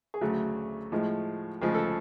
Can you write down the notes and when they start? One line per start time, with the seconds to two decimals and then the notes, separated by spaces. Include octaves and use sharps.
0.14 G#4
0.21 D2 C#3 F#3 A3 F#4
0.92 A2 F3 G#3
1.61 D2 C#3 F3 G#3 G#4
1.75 A4